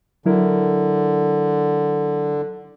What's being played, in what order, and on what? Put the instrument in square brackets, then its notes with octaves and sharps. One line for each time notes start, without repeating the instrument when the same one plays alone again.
[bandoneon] D3 [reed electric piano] F#3 E4 A#4